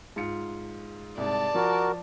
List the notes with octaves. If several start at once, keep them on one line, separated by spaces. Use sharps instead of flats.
G#2 F4 C#7
C2 G#2 D5 A5
F3 F#4 A#4